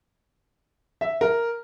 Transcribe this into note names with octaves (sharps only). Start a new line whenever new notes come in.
E5
A#4